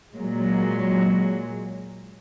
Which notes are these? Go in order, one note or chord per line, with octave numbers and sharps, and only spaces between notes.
A#2 F#3 G#3